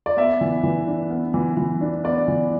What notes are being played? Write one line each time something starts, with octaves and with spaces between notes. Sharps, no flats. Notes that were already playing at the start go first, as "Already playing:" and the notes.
D5
B3 E5
E3
E3
D4
B3
E3
E3
D4
B3 D5
E3